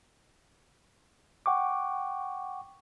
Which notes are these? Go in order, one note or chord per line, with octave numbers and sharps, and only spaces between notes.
F#5 G5 C#6 D6